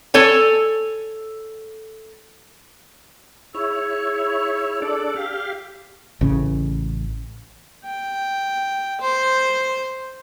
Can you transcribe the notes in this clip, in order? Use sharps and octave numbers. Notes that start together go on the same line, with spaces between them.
A4 C#5 G#5
E4 G#4 C#5 E6
D4 A4 D5
G4 F5
A1 C#3
G5
C5